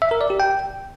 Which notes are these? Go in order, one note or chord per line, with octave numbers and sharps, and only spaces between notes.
E5
A#4
D5
G4
G5